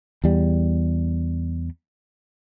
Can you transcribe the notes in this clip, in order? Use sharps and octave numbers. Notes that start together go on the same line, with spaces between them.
E2 G3